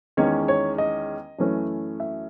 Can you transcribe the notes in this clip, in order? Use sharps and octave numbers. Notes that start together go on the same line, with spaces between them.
E2 D#3 G#3 C#4 C#5
C#5
D#5
F#2 E3 A3 C#4
E5